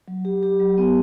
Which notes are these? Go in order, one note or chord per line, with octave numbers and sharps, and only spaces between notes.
F#3
G4
G4
F#3
B3